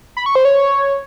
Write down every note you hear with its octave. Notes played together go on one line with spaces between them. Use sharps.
B5
C#6
C5
C#5